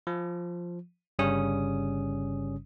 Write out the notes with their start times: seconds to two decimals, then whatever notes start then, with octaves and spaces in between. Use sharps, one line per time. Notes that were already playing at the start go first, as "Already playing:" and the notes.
0.07 F3
1.19 G1 G2 C#3 G3 C#4 D#6